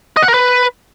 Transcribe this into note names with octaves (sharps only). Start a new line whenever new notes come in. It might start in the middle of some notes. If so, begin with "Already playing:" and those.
D#5
F#5
A#4
B4